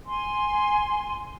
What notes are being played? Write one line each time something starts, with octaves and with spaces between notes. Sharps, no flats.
G#5 C6